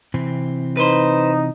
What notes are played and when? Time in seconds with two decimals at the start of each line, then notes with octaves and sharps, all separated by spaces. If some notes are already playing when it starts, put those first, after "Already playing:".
0.14 C3 E3 C4
0.77 D#4 B4 C5